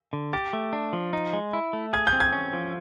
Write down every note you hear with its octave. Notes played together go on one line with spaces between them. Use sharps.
D3
G4 A6
A3
D4
F3
D#4
G#3
E4
A3
G#4 G#6
G6
C4
G#6
C#4
F3